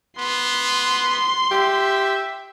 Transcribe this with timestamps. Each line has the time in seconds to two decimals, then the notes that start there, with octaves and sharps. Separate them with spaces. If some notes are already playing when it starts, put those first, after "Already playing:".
0.18 B3 C6
1.51 G4 E5